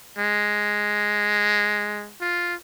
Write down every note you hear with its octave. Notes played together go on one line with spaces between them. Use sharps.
G#3
F4